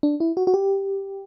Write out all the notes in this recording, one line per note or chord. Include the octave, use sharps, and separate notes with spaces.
D4
E4
F#4
F#4
G4